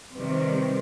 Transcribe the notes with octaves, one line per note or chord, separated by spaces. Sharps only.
C3 D#3 G3 B4
C5
B4
A#4